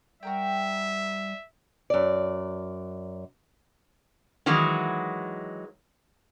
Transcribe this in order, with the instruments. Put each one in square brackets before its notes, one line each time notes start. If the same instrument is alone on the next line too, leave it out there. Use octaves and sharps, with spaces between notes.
[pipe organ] G3 [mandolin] F#4 A#4 G5 [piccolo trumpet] E5
[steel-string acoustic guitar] F#2 D5
[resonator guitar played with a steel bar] D#3 E3 F#3 G#3